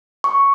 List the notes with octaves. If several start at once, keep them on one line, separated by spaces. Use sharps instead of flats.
C#6